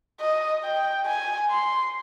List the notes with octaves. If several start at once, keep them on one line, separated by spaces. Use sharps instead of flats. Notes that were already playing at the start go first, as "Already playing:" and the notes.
D#5
G5
G#5
C6